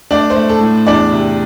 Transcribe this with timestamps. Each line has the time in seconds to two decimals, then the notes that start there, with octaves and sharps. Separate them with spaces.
0.11 A3 D4 D5
0.30 C5
0.36 A3
0.49 A4
0.61 A2
0.87 E2 D4 D5
1.12 C3